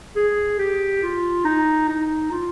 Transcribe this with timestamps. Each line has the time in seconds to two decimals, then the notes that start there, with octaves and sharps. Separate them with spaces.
0.16 G#4
0.59 G4
1.03 F4
1.45 D#4
1.88 D#4
2.31 F4